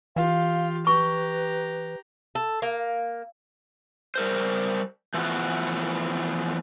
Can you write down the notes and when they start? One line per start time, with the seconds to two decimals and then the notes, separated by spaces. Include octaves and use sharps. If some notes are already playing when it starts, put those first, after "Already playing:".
0.16 E3 F4 G4 F5
0.87 G4 B4 A#5 C#6
2.35 A4
2.62 A#3
4.16 G3 A#4 C5
5.14 E3 F3 A3 B3 F4 F#4